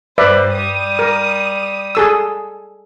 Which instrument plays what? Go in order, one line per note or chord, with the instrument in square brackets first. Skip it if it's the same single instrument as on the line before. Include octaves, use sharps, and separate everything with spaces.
[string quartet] G2 G3 C5 [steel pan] B4 D5 E5
[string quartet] G3 D#6
[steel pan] A#4
G#4 A4 E6